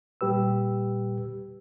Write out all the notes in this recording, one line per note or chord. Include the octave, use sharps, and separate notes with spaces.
A#2 G3 G4 B4 E6